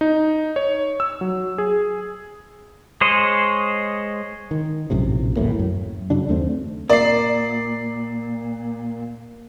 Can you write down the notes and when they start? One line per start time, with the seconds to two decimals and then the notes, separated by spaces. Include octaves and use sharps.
0.01 D#4
0.56 C#5
1.00 E6
1.21 F#3
1.58 G#4
3.01 G#3 C5 C#5 D#5
4.51 D#3
4.90 A#1 F#2 A2 C3
5.36 D1 E2 A2 A#3
5.59 F#2
6.10 F#2 C#3 F#3 D4
6.29 D#2 A3 B3 C4
6.90 A#2 A#4 D5 C7